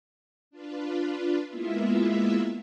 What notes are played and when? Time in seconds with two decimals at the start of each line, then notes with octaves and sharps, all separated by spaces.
0.51 D4 F4 B4
1.48 G#3 A#3 B3 E4 F4 E5